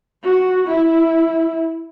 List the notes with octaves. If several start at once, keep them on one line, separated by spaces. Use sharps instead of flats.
F#4
E4